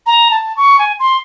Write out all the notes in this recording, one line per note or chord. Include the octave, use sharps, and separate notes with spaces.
A#5
A5
C#6
G#5
C6